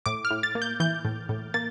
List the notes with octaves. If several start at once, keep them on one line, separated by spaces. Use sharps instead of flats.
A2 D6
F6
A2
A6
A#3
G6
E3 G6
A2
A2
A#3 A6